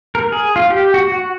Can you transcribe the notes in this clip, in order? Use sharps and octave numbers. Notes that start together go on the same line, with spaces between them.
A#4
G#4
F4
G4
F#4
F#4